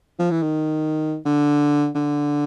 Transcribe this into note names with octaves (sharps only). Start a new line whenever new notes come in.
F3
E3
D#3
D3
D3